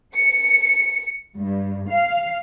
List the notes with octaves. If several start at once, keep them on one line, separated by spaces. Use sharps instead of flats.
C#7
G2
F5